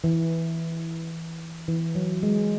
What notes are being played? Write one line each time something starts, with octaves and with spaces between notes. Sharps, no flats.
E3
E3
F#3
G#3